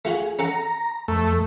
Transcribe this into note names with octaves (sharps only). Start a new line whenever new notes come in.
A3 F4 F#4 G#4
C#4 A4 F#5 A#5
F2 A3